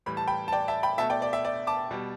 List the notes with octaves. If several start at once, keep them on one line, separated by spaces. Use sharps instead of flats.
A2 E3 G3 B5
A5
G5 B5
A5
D5 G5
E5 A5
G5 B5
B2 A3 E5 A5
D5 G5
D5
E5
D5
A5 D6
B2 G3